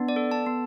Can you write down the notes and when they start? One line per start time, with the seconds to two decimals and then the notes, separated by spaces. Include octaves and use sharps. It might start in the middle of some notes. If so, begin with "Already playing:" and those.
Already playing: B3 D4
0.09 D5
0.16 A4
0.31 A5
0.46 B3